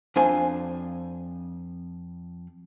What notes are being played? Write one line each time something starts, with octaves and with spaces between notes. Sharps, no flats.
F2 D4 C5 G#5